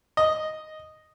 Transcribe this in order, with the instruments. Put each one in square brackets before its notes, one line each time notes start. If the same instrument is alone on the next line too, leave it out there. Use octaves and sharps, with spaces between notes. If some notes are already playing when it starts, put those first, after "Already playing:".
[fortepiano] D#5